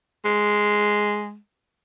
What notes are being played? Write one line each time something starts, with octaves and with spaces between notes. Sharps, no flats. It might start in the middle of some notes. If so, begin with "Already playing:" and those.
G#3